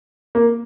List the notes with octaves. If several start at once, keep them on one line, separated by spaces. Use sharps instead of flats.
A#3